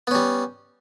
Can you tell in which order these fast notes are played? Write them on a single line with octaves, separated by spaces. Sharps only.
B3 C#4 G3